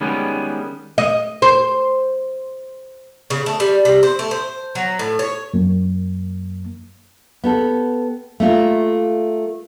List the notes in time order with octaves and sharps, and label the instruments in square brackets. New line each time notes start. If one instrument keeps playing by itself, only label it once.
[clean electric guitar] D#3 G3 G#3 B3 C#4
[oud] D#5
C5
[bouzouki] C#3
A3
G3
C3
C5
A3
C5
F#3
A2
C#5
[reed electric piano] F#2 A#3
[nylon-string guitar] B3 G4 A4
A3 A#3 F4